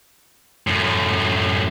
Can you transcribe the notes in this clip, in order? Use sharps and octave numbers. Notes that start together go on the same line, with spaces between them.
F#2 A2